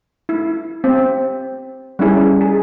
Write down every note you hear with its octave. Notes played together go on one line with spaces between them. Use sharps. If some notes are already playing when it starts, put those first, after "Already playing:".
E4
C4
G3 C#4 E4 G#4
G#4